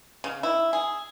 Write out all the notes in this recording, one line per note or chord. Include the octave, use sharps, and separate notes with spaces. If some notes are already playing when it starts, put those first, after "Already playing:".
C#3
E4
G#4